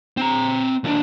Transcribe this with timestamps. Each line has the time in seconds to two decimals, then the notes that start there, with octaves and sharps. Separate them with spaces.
0.17 C4 A#5
0.84 D#2 D4